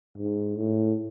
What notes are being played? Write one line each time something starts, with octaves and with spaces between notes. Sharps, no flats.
G#2
A2